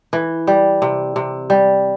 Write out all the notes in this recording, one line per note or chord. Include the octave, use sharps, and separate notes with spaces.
E3
G3
C3
C3
G3